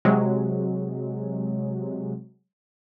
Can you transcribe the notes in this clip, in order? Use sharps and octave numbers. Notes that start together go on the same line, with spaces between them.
C3 F#3 G#3